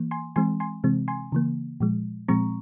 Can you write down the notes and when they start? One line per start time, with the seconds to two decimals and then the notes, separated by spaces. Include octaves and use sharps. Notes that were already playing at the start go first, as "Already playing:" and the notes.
Already playing: E3 A#3
0.11 G#5 C6
0.36 E3 G#3 C4 G#5 C6
0.60 G#5 C6
0.84 C3 E3 G#3 C4
1.08 G#5 C6
1.32 C#3 E3 A#3
1.80 A#2 F3 G#3
2.28 A#2 F3 G#3 C4 A#5 C#6